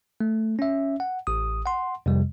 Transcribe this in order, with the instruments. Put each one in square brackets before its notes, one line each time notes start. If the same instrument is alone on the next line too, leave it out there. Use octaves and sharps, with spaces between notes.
[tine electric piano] A3
C#4 E5
F#5
A1 D#6
F#5 C6
F2 C3 G3